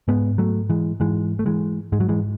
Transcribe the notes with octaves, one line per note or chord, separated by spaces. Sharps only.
G#2 G#3 B3
F#3 A3
E3 G#3
G#2 E3 G#3
A3
E3 G#3
G#2 G#3
F#3
E3 G#3